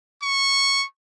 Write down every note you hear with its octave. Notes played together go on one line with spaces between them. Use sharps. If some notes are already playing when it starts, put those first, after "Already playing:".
C#6